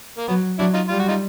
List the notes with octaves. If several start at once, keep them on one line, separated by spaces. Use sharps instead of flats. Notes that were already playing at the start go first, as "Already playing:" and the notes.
A#3
F#3 B3
F#3 D4 E4
D#4 F4
G3 F4
F#4
D#4 F4